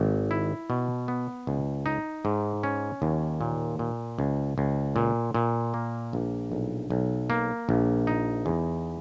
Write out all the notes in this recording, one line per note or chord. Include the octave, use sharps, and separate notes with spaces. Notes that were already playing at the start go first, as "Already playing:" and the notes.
Already playing: G#1
E4
B2
B3
C#2
D#4
G#2
C#4
D#2
A#2
A#2
C#2
C#2
A#2
A#2
A#3
A#1
B1
B1
A#3
A#1
D#4
E2